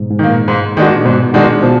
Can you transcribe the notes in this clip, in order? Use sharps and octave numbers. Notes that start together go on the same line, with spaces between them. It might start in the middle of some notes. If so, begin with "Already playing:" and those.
Already playing: G#2 B2
G#2
D#3 A#3
A#2
G#2
D#3 G#3 D4 F#4
A#2
G#2 B2
D#3 G#3 D4 F#4
B2 F3